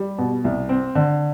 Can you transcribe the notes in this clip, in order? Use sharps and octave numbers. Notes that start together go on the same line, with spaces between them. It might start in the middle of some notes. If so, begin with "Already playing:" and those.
Already playing: G3
B2
C2
C4
D3